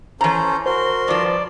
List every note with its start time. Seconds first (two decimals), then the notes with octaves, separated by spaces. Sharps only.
0.21 E3 C#4 A4 C5 A#5
0.66 F#4 A#4 C5 C6
1.08 G2 F3 D5